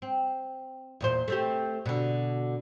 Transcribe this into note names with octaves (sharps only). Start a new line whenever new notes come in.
C4
E2 A#2 C5
A3 C4 G4
B2 D3